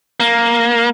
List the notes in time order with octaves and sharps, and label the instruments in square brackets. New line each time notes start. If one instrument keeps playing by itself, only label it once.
[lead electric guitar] A#3